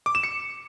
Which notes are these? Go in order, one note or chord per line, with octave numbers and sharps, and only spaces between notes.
D6
E7
C#7